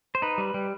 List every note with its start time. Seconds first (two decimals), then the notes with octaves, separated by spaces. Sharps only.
0.15 C5
0.22 D#4 B4
0.38 G3
0.54 G3